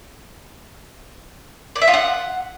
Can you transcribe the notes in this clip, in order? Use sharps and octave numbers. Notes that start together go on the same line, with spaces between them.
D5
E5
F4
F#5